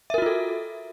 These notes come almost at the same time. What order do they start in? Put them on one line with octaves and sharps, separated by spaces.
E5 A#4 F#4 F4 A4